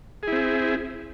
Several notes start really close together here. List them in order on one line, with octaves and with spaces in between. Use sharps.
G#4 E4 C4